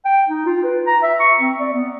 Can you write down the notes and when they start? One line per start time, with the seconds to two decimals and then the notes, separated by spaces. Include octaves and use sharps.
0.05 G5
0.29 D#4
0.46 F4
0.64 B4
0.86 A#5
1.03 E5
1.20 C#6
1.40 C4
1.60 D5
1.73 B3